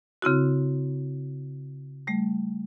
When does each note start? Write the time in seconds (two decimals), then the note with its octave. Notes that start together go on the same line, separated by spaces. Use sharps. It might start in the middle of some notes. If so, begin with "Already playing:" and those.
0.22 C#3 C4 E4 F#4
2.07 G3 A3